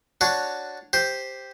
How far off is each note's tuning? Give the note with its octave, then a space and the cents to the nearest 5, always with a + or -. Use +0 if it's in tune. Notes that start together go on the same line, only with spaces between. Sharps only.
D4 +0 F#4 +0 C#5 +0
G4 +0 C5 +0